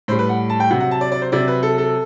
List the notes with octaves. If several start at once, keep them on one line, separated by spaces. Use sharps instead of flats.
A2 G3 C5
B4
F#5
A5
G5
C3 F#3 F#5
F#5
A5
D5
D5
C5
C3 F#3 D5
B4
A4
A4